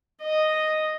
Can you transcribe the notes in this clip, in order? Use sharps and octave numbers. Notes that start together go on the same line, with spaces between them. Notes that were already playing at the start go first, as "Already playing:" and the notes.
D#5